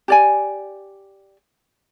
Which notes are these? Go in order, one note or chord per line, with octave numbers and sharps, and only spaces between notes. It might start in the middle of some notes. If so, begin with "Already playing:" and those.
G4 D5 G#5